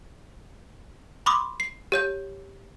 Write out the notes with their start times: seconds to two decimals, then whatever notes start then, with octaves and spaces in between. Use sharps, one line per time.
1.26 B5 C6 D6 D#6
1.60 C7
1.92 G4 C#5 G6